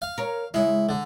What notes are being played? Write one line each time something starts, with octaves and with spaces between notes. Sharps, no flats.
F5
A#4 C#5
C#3 G#3 E4
D3